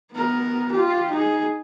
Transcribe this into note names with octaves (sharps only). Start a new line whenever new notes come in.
B3 A#4
F4 G4
D#4 G#4